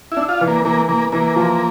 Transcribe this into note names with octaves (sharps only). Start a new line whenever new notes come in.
E4
D4
F4
E3
A#3
E3 A#3
E3 A#3
E3 A#3
F3